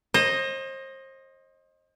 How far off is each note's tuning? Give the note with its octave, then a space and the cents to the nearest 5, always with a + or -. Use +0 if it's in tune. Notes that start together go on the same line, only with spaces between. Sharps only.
C5 +35 D#5 +0